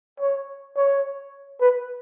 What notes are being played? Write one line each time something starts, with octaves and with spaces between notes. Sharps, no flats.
C#5
C#5
B4